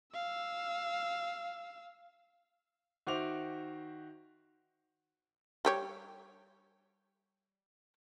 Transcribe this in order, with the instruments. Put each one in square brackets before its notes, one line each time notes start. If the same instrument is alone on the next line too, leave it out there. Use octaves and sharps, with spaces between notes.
[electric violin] F5 E6
[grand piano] D#3 F#4 C5 E5 D6 F7
[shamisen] G3 G4 C#5